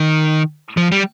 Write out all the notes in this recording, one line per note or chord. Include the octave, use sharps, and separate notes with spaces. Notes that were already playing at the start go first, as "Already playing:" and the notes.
Already playing: D#3
F3
G3